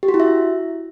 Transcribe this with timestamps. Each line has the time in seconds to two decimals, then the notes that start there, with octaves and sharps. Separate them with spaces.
0.03 G4
0.08 F#4
0.14 E4
0.20 E5